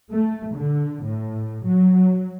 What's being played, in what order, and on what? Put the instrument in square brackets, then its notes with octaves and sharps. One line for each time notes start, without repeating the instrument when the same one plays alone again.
[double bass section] A3
D3
A2
F#3